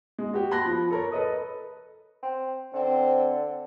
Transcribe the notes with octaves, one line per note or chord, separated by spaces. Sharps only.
G#3
F#4 G4
A5 B5 C6 F#6 A#6
F3
A4 A#4 C#5
A4 B4 D#5 D#6
C4
D3 C4